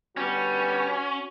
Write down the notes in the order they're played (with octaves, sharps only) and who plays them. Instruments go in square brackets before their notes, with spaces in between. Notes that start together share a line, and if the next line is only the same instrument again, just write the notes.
[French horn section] D3 B3 B4 [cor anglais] G3 [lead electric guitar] C#4 [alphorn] F#4